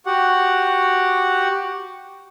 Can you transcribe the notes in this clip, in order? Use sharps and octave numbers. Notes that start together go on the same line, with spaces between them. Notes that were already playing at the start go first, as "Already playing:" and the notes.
F#4 G4 F#5